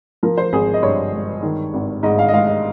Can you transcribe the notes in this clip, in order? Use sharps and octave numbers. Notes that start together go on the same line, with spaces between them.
F3 A#4
C5
G#1 G#4
D#5
G2 C#5
G#3
D#3
G#1
G#2 D#5
F5
D#5
G#3 F5
D#5